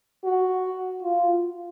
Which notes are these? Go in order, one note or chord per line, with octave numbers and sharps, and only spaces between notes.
F#4
F4